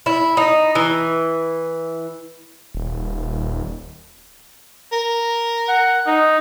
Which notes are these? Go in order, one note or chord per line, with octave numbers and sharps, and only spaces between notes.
E4
D#4
E3
D#1
A#4
F#5
D#4